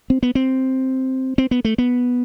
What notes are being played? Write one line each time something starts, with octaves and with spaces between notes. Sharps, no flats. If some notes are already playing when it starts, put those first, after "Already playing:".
C4
B3
C4
C4
B3
A3
B3